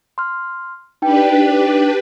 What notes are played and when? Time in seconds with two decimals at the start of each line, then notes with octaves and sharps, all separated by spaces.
0.18 C6 F6
1.02 D4 D#4 G4 B4 G5